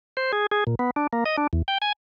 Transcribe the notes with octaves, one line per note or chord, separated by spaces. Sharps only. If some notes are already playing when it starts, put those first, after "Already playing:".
C5
G#4
G#4
A#2
B3
D4
A#3
D#5
D4
E2
G5
G#5